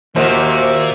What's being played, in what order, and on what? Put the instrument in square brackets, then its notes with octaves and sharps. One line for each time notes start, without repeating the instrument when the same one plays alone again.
[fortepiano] D#2 D#5 [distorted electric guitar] A#2 [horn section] A#3 F#4 E5 [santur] C5